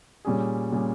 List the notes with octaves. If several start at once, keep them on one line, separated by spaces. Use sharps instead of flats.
A#2 G3 C#4 G#4
A#2 G3 C#4 G#4